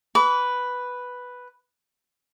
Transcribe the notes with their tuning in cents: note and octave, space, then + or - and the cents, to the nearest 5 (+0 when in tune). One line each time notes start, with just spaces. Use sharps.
B4 +0 D6 -40